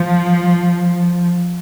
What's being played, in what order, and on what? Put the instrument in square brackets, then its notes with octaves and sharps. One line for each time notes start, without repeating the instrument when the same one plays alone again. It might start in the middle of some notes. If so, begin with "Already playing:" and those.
Already playing: [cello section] F3